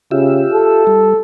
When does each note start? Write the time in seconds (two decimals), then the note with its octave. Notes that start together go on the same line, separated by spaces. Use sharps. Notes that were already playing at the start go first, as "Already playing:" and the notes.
0.11 C#3 F4 G4 E5
0.53 A4
0.87 G3